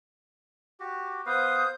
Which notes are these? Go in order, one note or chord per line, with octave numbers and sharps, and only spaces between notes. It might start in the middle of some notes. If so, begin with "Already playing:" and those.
F#4 G4
B3 B4 C5 F5 D#6 G6